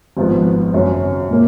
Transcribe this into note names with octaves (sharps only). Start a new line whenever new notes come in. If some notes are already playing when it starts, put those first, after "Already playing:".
G#1 G#2 F3 B3
G#1 F#2 C#3 F#3 C#4
A#2 F#3 A#3